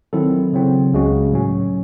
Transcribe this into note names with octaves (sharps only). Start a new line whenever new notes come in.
D#3 F#3 C4 E4 A4
C#3 F#3 C4
C#2 C#3 G#3 C#4 F#4
A2 F#3 C#4